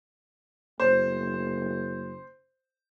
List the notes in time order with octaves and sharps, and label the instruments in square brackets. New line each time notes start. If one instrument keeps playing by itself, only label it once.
[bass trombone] F#1 [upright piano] C5